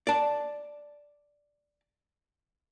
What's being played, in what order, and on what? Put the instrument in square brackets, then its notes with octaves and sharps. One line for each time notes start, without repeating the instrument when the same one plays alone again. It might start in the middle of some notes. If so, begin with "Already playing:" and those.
[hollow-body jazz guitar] D5 A5